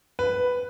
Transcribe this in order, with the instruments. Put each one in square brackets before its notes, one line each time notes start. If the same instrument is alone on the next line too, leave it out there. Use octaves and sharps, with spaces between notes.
[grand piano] B4